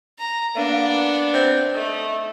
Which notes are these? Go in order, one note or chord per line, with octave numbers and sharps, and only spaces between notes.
A#5
A#3 B3 D4
C4
A3 D#4